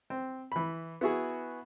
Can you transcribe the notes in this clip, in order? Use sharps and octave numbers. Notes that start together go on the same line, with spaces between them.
C4
E3 B5
B3 E4 F#4 G#4